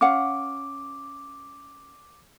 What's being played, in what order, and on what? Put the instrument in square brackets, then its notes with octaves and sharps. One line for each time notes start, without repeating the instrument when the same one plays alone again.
[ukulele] C#4 F5 F#5 [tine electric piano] D6